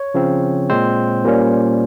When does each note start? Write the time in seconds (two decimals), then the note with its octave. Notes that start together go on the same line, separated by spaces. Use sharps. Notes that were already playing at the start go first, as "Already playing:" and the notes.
Already playing: C#5
0.14 C#3 F3 C4
0.70 A#2 G#3 C4 C5
1.24 A#2 G3 A#3 C#4